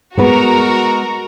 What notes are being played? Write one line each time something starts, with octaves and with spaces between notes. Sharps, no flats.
G#3 B3 F#4 A#4 B4 A#5